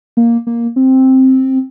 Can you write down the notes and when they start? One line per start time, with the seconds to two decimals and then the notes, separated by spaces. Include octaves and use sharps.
0.17 A#3
0.47 A#3
0.76 C4